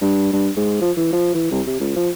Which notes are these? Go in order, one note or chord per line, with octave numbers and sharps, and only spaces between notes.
G2
G2
G#2
F3
E3
F3
E3
C2
C3
C#2
F3